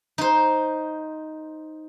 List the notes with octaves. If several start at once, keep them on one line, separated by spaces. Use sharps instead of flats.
D#4 C5